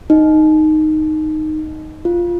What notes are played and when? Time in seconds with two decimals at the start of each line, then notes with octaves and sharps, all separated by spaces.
0.10 D#4
2.05 F4